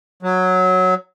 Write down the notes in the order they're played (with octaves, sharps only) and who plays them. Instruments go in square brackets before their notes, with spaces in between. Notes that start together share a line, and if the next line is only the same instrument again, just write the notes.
[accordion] F#3